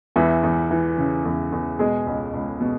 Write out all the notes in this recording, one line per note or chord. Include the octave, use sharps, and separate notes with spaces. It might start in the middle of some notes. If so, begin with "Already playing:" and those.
E2 E3 E4
E2
E3
C#3
E2
E2
B2 G#3 G#4
C#2
C#2
B2